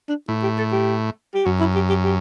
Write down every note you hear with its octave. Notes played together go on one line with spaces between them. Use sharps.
D4
A2 E4
G4
A4
G4
G4
F#2 F#4
E4
G4
G4
G4